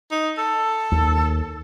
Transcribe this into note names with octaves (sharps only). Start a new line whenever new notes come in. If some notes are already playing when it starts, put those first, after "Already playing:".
D#4
A4
D#2